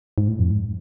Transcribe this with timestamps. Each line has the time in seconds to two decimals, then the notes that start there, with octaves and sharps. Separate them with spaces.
0.18 G#2
0.28 A2
0.39 F2
0.51 G#2